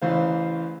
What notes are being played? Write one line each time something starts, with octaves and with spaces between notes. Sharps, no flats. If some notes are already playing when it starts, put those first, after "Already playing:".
A1 C#3 E3 C5 F5